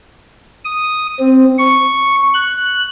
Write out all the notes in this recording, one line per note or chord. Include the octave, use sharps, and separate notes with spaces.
D#6
C4
C#6
F#6